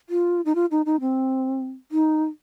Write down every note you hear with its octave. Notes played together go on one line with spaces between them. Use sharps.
F4
D#4
F4
D#4
D#4
C4
D#4